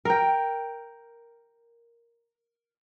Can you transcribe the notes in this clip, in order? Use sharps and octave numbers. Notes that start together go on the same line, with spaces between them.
A#4 G5